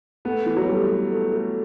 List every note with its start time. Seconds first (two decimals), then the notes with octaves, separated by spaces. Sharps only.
0.25 A3 B3
0.46 E3
0.57 F#3
0.68 G3 A3
0.90 A3
1.11 A3
1.33 A3